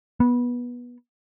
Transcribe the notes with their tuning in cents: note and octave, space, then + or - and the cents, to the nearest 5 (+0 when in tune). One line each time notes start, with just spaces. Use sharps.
B3 -20